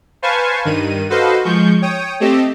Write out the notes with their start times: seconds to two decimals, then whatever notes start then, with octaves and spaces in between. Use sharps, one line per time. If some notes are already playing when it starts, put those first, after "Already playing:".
0.22 B4 C5 F5 G#5 A5 C#6
0.65 G2 D#3 D#7
1.10 F#4 A4 B4 C5 D#5 F5
1.45 F3 G#3 C#6 G6
1.82 C#5 G5 D#6
2.20 A3 C4 G4 D#5 E6